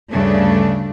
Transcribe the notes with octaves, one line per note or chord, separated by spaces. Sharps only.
D2 G2 C#3 A3 D4